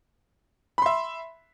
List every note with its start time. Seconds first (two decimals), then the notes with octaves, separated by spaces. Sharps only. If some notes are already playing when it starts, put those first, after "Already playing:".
0.78 B5
0.82 C6
0.86 E5